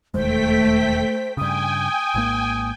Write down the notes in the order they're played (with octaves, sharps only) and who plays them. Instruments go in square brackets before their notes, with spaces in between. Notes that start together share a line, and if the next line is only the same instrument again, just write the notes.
[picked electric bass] E1 D#2 G#3 [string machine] A3 G5 B6 [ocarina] C5
[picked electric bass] G2 C#3 [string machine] G5 G#5 [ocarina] D#6
[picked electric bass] G#1 G#2 A#3